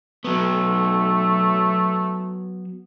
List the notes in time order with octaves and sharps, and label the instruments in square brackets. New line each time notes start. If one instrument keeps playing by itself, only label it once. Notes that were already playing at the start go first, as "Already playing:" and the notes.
[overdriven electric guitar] F#3 B3 [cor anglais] A3